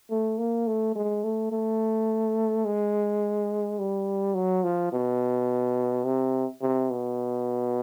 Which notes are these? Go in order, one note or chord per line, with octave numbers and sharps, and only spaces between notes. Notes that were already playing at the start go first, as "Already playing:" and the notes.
A3
A#3
A3
G#3
A3
A3
G#3
G3
F#3
F3
B2
C3
C3
B2